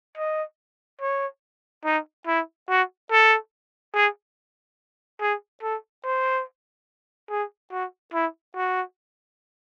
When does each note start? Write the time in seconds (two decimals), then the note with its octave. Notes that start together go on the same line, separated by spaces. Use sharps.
0.18 D#5
1.01 C#5
1.85 D#4
2.27 E4
2.69 F#4
3.11 A4
3.94 G#4
5.21 G#4
5.63 A4
6.04 C5
7.30 G#4
7.72 F#4
8.14 E4
8.56 F#4